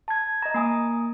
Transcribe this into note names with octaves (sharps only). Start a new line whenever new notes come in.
A5 G#6
D#5 A#5
A#3 G#5 D#6